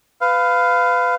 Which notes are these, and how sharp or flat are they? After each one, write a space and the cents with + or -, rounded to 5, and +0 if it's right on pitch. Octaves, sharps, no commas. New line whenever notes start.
B4 +25 F5 +0